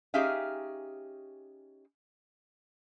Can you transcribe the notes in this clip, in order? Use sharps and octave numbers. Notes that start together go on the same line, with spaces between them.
C#4 D#4 G4 G#4 E5 F5